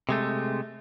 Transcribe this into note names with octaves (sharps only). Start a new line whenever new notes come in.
C3 G#3 A3